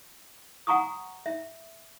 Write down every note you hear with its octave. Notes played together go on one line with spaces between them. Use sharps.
F#5 G#5 A#5 C#6 D#6
E5